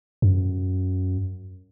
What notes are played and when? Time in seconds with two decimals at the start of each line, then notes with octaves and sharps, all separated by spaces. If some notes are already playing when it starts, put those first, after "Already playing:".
0.22 F#2